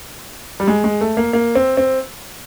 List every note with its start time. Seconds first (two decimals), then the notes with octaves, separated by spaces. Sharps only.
0.60 G3
0.68 G#3
0.84 G#3
1.01 A3
1.17 A#3
1.33 A#3
1.55 C4
1.77 C4